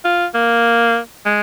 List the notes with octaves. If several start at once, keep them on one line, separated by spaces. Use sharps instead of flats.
F4
A#3
G#3